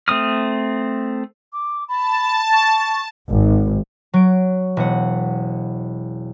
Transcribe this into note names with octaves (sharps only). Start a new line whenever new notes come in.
A3 C4 D#6 F6
D6
A5 B5
C#6
G#1
F#3 D7
E1 F#5